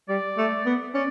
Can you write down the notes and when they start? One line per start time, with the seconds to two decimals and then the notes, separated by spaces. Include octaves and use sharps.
0.09 G3 D5
0.38 A3
0.66 B3
0.94 C#4 D5